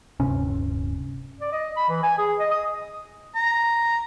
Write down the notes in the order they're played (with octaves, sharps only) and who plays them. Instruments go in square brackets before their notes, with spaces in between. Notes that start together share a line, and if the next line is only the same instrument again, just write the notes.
[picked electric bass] D1 G2 C3 C#4
[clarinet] D5
D#5
B5
E3
G#5
G#4
D#5
D#6
[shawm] A#5